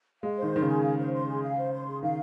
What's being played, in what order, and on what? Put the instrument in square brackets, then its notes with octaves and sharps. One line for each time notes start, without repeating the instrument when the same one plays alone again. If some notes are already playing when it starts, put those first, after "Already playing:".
[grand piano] G#3 [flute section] F5
[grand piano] D#3 [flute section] C5
[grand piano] D#3 [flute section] C6
[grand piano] C#3
[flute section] G#4
F5
C5
C6
G#4
F5
C5
C6
G#4
[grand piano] D#3 [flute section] F5